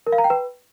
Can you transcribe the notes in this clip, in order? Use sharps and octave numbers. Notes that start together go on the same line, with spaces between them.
A#4
F5
A#5
G5
B4